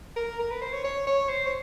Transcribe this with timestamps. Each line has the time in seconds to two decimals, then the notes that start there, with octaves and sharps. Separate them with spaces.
0.16 A#4
0.40 A#4
0.51 B4
0.61 C5
0.73 C#5
0.85 C#5
1.07 C#5
1.29 C5
1.47 C#5